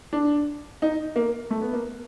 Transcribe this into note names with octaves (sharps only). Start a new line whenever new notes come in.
D4
D#4
A#3
A3
B3
A#3